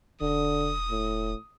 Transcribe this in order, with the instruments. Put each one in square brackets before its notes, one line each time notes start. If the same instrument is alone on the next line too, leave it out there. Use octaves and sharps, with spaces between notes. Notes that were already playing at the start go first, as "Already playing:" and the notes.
[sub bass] E1 [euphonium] D3 [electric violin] D#6
[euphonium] A2